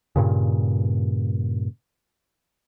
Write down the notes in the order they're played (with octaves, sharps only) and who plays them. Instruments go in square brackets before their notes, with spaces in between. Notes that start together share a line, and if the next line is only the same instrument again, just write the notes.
[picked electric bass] G2 A#2 C#3